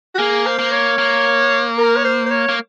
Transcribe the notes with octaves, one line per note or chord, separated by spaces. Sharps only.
F#4
A#3 G#4
C5
A#3
C#5
A#3
A#4
C#5
C5
C5
C#5
A#3